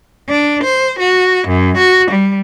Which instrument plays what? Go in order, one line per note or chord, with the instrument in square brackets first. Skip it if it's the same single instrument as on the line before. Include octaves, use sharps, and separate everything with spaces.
[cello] D4
C5
F#4
F#2
F#4
G3